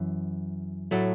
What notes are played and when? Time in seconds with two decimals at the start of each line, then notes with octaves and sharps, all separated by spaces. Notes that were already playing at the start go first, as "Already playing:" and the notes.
Already playing: F#2 E3
0.91 A2 F#3 A3